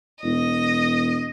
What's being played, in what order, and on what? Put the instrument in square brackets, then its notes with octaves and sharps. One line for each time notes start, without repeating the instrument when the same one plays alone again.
[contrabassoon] E1 [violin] D#5